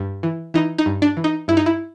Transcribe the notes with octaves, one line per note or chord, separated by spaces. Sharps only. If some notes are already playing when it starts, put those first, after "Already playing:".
Already playing: G2
E3
E3 D#4
D#4
G2
D4
E3
D#4
G2 E4
D#4
E4